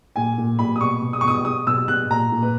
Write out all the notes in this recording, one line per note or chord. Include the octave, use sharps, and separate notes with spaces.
A#2 G#5
A#2
A#2 B5
D#6
B2 C#6
B2
D#6
C#6
B2 D#6
B2 D#6
B2 E6
B2 F#6
A#2 A#5
A#2
B4